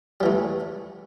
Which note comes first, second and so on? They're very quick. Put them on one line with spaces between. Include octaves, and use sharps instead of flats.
G3 E3 A3